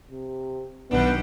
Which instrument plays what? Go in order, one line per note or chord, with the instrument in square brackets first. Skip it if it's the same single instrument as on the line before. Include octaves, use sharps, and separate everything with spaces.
[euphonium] C3
[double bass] B1 [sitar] D#3 G3 D4 [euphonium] B3